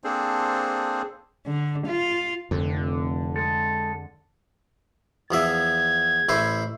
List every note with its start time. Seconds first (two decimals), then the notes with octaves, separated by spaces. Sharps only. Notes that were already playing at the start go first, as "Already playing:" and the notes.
0.04 A#3 C4 D4 G#4 A4 C5
1.46 D3
1.87 F4
2.51 F1 F2 D3
3.36 G#3 A4
5.31 E2 F3 E5 G#6
6.29 A1 E4 C5